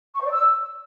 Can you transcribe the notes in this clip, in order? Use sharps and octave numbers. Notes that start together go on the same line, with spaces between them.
C#6
C5
D5
E6